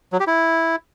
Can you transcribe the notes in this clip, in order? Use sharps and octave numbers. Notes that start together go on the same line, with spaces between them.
F#3
G4
E4